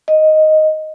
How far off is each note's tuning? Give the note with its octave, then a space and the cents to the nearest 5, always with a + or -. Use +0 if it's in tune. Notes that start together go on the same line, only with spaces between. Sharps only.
D#5 +0